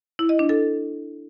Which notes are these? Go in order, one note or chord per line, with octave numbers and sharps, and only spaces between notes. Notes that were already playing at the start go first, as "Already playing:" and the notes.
E4
D#5
D4
A4